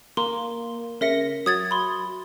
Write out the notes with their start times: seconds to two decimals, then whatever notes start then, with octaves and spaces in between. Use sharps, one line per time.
0.17 A#3 C6
1.01 C#3 A#4 E5 A#6 C#7
1.46 F#3 D#6 G#6 A6
1.71 B5 C6